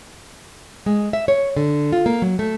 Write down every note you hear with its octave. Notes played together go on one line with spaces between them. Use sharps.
G#3
E5
C#5
D3
F4
A#3
F#3
A3